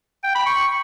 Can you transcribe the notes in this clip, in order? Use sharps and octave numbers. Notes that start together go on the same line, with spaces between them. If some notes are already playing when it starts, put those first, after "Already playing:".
G5
B5
C#6